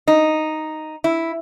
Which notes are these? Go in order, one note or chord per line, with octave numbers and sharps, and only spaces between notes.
D#4
E4